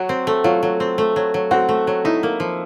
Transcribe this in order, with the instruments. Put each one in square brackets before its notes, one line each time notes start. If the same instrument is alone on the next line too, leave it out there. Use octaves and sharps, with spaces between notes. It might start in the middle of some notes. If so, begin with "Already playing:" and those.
Already playing: [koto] F#3 [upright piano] F#4
[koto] C4
A3
[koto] F#3 [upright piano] F4
[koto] F#3
C4
A3
F#3
F#3
[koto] C4 [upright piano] F#4
[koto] A3
F#3
[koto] D#4 [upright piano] E4
[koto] A#3
F3